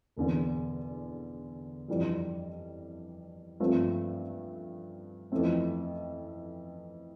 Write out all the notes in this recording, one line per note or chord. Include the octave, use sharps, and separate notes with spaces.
E1 E2 D3
F2 E3 G3 D4
G2 F3 A3 C4
F2 E3 A3 C4